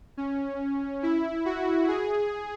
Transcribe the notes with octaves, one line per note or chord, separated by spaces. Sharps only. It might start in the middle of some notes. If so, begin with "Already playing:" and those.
C#4
E4
F#4
G#4